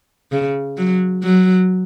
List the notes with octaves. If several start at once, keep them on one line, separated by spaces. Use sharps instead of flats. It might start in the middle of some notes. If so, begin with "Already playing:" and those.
C#3
F#3
F#3